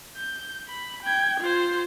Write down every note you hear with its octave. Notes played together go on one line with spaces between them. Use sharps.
G6
B5
G5 G#6
F4 C5